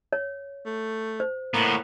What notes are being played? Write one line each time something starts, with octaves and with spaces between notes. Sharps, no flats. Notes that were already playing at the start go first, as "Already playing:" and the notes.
C#5
A3
C5
A2 A#3 B3